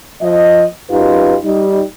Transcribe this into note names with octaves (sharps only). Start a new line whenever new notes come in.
F3 D#5
F#2 D#4 F4 G4 B4
G3 D#4